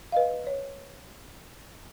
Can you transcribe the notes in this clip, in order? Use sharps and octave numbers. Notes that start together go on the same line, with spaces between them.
B4 D#5 F5
C#5